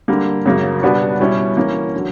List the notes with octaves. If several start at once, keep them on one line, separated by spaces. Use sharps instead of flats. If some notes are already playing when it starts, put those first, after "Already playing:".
D3 G3 A#3
F#2 C#3 F#3 A#3
B2 G3 B3 D4 F#4
B2 G3 C#4 E4
E3 A#3 C#4
D3 F#3